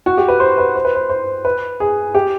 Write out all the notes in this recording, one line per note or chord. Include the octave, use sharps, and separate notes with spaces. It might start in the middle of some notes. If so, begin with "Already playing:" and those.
F#4
G4
B4
C5
B4
C5
B4
C5
C5
B4
G#4
G4